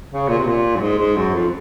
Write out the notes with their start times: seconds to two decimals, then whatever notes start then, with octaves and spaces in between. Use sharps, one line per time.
0.11 C#3
0.28 A#2
0.38 C3
0.46 A#2
0.76 F#2
0.80 G#2
0.98 G#2
1.16 F#2
1.34 F2